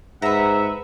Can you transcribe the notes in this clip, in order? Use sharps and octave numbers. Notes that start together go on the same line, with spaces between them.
G#2 B4 E5 F#5 A#5